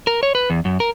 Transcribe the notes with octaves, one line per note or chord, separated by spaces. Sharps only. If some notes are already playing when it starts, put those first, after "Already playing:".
A#4
C#5
B4
E2
F#2
A#4